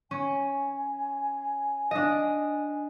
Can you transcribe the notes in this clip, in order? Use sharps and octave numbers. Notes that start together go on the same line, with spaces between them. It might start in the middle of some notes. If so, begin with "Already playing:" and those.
C#4 G#5
D4 D#5